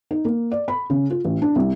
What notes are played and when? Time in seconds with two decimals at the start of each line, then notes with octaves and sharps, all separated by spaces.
0.11 D#4
0.25 A#3
0.52 D5
0.68 B5
0.90 C#3
1.10 F4
1.25 A1
1.42 D4
1.56 C2